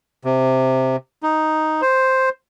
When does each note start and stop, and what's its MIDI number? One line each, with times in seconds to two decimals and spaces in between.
0.25 0.96 48
1.23 1.81 63
1.82 2.29 72